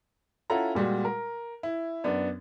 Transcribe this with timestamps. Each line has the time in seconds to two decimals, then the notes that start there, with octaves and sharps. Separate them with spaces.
0.50 C#4 E4 F4 A4 F#5 A#5
0.75 A#2 G3 G#3 F#4
1.05 A#4
1.63 E4
2.04 F#2 B3 D4 D5